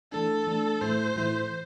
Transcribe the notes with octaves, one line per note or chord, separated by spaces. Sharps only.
E3 A3 D4 A4
E3 A3 D4
A2 E3 A3 E4 C5
A2 E3 A3 E4